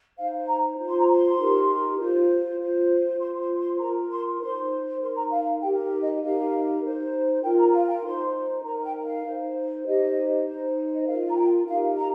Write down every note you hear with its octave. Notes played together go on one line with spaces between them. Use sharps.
D#4 C5 F5
A#5
F4 C5
C6
A#5
C6
D#4 G4 A#4
F4 C5
F4 C5
F4 C5 C6
C6
C6
F4 A#4 A#5
C6
D#4 C5 C6
D#4 A#4 C6
A#5
F5
F5
D#4 G4 A#4 G5
D#5
D#4 G4 A#4 F5
D#4 C5
F4 A#4 G5
A#5
F5
G5
D#4 C5 C6
D#4 A#4 A#5
G5
F5
D#4 C5
D#4 G4 C5 D#5
D#4 C5
D#5
F4 A#4 F5
A#5
G5
D#4 G4 A#4 F5
A#5